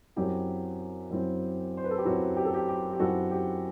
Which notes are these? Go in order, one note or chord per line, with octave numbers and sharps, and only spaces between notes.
F#2 F#3 C4 E4 G4
F#2 F#3 C4 E4
C5
B4
A4
G4
F#2 F#3 C4 E4 F#4
G4
A4
G4
G4
G4
F#2 F#3 C4 E4 F#4 A4
G4